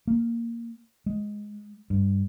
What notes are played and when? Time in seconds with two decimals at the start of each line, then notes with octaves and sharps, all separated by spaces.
0.07 A#3
1.06 G#3
1.90 G2